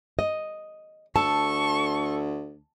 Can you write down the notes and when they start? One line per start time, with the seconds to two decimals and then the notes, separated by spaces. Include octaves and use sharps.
0.19 D#5
1.16 D2 A4 A5 C#6